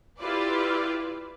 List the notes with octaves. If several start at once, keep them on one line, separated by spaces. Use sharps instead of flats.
E4 F4 G4 B4 D5